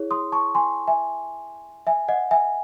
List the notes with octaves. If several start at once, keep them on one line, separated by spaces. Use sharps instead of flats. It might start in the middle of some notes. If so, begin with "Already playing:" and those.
Already playing: E4 G#4 C#5
C6 D#6
A5 C#6
G#5 C6
E5 G#5
E5 G#5
D#5 F#5
E5 G#5